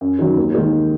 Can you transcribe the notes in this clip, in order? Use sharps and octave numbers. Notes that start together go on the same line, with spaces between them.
F#2
D#3 F#3
D#2
D#3 G#3